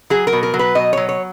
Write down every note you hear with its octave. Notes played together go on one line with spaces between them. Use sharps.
F#3 G#4
A#4
B2
A#4
F#3
B4
B2 D#5
F#3 C#5
C#5